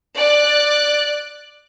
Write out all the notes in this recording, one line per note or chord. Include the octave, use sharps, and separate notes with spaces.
D5 F#6